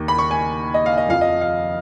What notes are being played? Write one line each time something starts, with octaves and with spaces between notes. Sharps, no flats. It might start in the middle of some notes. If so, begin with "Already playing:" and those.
Already playing: D#2 D#3
B5
C#6
G#5
D#5
F5
D#5
F2 F3 F5
D#5
F5